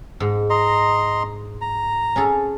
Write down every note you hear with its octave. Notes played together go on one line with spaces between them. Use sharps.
G#2
D#5 A#5 C6
A#5
C#4 G#4 A4